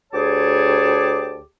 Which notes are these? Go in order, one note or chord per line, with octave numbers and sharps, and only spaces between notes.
D2 G4 G#4 C#5 A5 D6